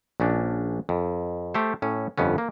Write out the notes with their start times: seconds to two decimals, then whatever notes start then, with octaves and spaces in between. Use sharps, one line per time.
0.20 A#1 C#4 D4
0.89 F2
1.54 A3 G4 A4 C5
1.82 A2 C#4
2.18 G1 F2 B3 C#4
2.38 A#3